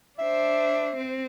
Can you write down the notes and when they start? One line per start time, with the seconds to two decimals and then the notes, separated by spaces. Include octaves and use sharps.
0.19 D4 C5 E5
0.96 C4